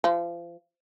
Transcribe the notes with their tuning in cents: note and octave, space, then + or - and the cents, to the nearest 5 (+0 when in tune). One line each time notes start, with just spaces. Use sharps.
F3 -30